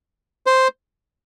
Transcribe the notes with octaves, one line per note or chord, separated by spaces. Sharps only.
C5